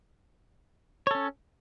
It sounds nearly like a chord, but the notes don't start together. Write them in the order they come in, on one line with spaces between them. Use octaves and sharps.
C#5 A4 C#4